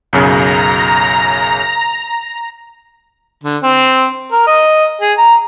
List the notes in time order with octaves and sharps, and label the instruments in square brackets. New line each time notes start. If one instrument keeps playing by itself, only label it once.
[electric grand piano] B1 F#2 C#3 [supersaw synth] A#5
[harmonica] D3
C4
A#4
D#5
G#4
A#5